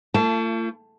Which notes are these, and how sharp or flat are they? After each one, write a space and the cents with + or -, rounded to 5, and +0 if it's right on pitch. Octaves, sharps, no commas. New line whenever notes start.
A3 +45 F4 -40 A5 -5